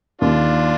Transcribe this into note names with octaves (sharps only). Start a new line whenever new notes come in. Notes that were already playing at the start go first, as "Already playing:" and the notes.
D#2 D4 F4